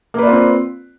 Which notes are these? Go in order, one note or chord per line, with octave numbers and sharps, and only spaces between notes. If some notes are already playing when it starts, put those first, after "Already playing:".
A#3 C4 F4 B4 D5